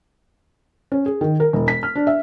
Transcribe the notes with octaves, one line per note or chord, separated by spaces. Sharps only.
C#4
G#4
D#3
A#4
E1
B6
F6
D4
E5